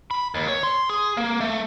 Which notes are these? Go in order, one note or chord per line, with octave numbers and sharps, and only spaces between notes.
B5
D#2
C#5
C6
G#4
A#3
A3